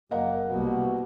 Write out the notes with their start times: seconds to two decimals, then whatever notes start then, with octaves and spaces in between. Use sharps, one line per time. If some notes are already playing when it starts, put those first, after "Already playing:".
0.11 F#1 A#3 D#5 F#5
0.49 C2 B2 A#3